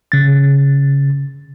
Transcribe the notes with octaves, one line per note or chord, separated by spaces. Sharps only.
C#3 A6